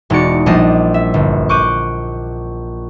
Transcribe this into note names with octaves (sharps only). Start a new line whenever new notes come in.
E1 G#3 D#4 F#4 D5 C#7
A#1 G3 D4 D#5 C7
E5
G1
C#6 D6 F#6 G6 D#7